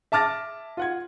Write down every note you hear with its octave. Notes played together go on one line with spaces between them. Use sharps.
E5 A5 D6 F6 A6 A#6
F4 F#5 G#6